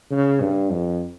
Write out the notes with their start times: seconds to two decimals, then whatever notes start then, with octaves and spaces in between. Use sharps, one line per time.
0.11 C#3
0.41 G2
0.70 F2